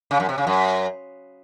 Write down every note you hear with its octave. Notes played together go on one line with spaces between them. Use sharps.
C#3
F#2
C3
C#3
F#2